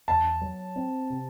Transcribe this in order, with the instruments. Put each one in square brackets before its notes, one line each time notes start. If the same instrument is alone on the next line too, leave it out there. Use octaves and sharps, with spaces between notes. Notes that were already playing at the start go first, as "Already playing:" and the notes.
[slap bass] E2 [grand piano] A5
[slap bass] F#3
C4
C3